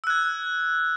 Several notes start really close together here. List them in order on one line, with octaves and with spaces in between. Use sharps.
E6 F#6 G#6